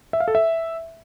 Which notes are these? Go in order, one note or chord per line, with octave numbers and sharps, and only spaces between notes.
E5
F5
A4
E5